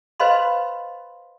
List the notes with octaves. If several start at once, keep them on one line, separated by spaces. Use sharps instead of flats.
B4 C5 D#5 F5 B5 C6